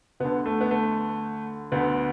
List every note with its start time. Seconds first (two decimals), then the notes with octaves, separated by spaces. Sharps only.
0.20 D2 D3 B3
0.46 A3
0.61 B3
0.71 A3
1.72 D2 D3 B3